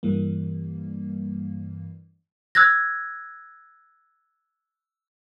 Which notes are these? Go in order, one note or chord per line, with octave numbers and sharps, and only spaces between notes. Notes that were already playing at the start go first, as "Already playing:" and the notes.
G2 E3 G3 A#3
E6 F#6 G#6 A#6